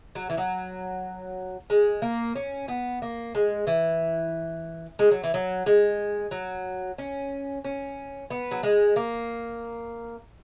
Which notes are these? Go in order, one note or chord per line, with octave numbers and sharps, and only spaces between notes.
F#3
E3
F#3
G#3
A#3
C#4
B3
A#3
G#3
E3
G#3
F#3
E3
F#3
G#3
F#3
C#4
C#4
B3
F#3
G#3
A#3